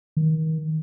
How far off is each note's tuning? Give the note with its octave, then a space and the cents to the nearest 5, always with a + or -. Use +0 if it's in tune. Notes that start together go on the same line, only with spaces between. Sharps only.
D#3 +30